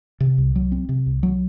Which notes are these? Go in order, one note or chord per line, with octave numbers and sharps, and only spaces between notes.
C3
C2
F#3
C4
C3
C2
F#3